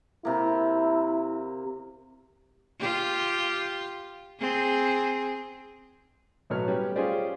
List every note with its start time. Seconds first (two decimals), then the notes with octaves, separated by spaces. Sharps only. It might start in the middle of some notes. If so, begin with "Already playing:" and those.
0.25 C3 A#3 E4
2.80 F4 G4
4.40 C4 G#4
6.50 B1 A2 F#3 B3 C#5 F6
6.68 G3 B3 C#4
6.96 C#4 F4 G4 G#4 C5 D5